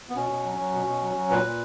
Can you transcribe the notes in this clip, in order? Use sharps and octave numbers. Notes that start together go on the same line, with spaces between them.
B3
B2 C#4
B2
F#3
F#3
B2
B2
F#3
F#3
A#2 B4
A#2